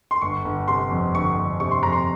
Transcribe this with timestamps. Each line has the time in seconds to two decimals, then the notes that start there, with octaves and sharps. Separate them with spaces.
0.11 C6
0.22 G1 C#6
0.44 G1
0.67 C3 C6
0.91 F2
1.14 G1 C#6
1.37 G1
1.60 C3 C#6
1.71 C6
1.83 F2 A#5
1.92 C6